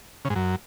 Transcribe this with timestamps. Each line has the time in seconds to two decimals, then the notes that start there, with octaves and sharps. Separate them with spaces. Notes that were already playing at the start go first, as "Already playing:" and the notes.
0.25 C#3
0.30 G#2
0.36 F#2